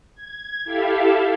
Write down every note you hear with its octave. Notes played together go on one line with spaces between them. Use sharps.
G#6
E4 G4 A4 E5 F5